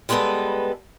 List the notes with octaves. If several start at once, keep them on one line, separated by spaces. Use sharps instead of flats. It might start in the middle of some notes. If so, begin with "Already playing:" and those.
G3 G#3 B3 G#4 A4 B4